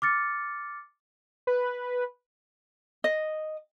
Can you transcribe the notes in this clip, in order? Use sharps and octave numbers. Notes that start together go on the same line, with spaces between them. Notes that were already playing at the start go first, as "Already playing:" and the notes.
D6 F6 A6 C#7
B4
D#5